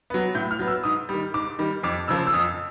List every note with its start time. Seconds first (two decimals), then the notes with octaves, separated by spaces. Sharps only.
0.10 F#3 B3
0.35 A2 G6
0.51 F6
0.59 F#3 B3
0.68 E6
0.84 G#2 D#6
1.09 D#3 G3
1.34 G#2 D6
1.59 D#3 G3
1.83 F2 D6
2.08 C#3 F3 A#3 E6
2.27 E6
2.33 F2 D#6